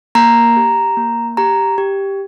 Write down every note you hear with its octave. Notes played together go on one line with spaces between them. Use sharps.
A#3 A#5
G4
A#3
G4 A#5
G4